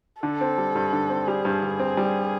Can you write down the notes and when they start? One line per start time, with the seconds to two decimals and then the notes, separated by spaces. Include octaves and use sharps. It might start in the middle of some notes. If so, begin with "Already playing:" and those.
0.23 D3 A4
0.41 C4
0.58 G3
0.75 G2
0.93 D3
1.10 C4
1.28 G3 G#4
1.45 G2
1.62 D3
1.79 C4
1.97 G3